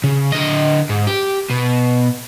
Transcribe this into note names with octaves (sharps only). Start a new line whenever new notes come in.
C#3
D3 D#5
G#2
G4
B2